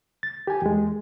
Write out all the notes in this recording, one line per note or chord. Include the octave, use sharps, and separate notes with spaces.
A6
G4 G#5
E2 G#3